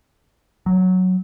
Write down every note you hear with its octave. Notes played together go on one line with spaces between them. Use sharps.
F#3